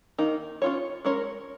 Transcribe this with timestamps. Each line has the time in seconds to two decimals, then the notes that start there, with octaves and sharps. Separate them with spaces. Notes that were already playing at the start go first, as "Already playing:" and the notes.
0.18 D#3 A#3 D#4
0.62 C#4 F4 C#5
1.05 G#3 C#4 A#4 C#5